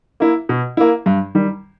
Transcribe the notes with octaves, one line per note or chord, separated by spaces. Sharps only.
A#3 E4
B2
A#3 E4
G2
D#3 G3